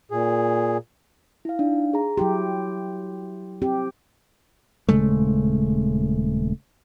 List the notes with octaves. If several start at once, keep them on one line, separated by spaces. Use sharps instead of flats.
A#2 G#4
E4 F5
D4 D#4 F5
G#4 A#5
F#3 E4 G4 C6
C4 G4
D#1 C#3 G#3 A3